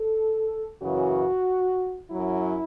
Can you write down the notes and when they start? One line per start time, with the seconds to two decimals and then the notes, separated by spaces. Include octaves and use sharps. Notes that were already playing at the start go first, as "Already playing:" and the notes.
Already playing: A4
0.82 F#2 C#3 E3 F#4
2.10 F#2 F#3 E4